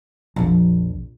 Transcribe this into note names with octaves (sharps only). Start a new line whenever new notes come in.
A#1 F2